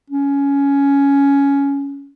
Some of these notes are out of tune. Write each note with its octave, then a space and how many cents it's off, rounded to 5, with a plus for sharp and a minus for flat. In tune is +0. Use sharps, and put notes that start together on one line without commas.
C#4 +10